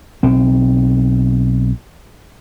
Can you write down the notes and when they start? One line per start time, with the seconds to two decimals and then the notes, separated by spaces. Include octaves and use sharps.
0.23 B1 C4